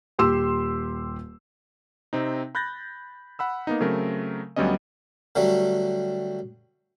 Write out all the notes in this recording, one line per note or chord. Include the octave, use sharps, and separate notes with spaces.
D#1 G4 C6 E6 E7
C3 C4 D#4
B5 F#6 G6 A6 A#6
F#5 B5 E6
A#3 B3 D#4
C#3 F#3 A3 C4 A#4
D2 F#3 G3 B3 C#4 D#5
D3 F#3 G3 A3